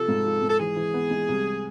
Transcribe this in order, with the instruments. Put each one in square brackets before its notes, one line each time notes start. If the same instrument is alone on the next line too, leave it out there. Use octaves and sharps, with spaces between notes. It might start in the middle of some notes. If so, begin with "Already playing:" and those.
Already playing: [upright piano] C3 F3 [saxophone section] A4
[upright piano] G#2
F3
G#2
[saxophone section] A4
[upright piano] E3 [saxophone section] G#4
[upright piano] E3
B3
G#3
C2